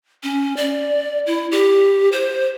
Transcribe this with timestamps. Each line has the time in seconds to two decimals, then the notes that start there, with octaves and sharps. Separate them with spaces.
0.23 C#4
0.57 D5
1.26 E4
1.52 G4
2.12 C5